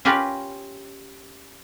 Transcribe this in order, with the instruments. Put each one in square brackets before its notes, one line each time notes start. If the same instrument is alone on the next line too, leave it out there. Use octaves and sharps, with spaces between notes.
[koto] C#4 F4 G4 A#4 B4